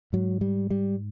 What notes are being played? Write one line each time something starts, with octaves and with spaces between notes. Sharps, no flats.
G#2 F#3
G3
G3